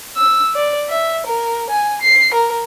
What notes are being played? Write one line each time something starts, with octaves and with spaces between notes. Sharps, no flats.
E6
D5
E5
A#4
G#5
C7
A#4